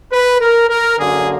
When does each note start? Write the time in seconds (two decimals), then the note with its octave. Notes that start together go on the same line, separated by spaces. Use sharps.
0.13 B4
0.41 A#4
0.70 A#4
0.99 F#2 D3 F#3 A#3 G#4